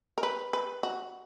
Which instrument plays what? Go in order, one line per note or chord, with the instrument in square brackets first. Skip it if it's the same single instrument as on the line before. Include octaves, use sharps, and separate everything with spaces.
[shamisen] A#4
B4
B4
F#4